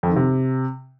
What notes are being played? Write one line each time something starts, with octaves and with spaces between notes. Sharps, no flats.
F2
D#3
C3